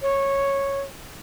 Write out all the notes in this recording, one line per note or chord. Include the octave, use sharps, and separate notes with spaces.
C#5